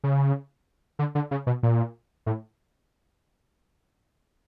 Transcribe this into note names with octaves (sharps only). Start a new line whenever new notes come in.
C#3
D3
D3
C#3
B2
A#2
A2